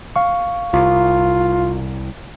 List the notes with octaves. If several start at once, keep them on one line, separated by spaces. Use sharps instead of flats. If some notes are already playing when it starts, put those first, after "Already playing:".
F5 C#6
C2 F4